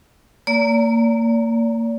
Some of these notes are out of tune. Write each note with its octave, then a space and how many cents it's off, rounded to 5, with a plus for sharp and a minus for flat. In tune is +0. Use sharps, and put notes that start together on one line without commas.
A#3 -25 D5 -40 A#5 +15